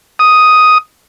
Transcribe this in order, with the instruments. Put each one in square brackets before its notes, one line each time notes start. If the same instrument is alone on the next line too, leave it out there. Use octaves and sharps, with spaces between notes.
[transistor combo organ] D#6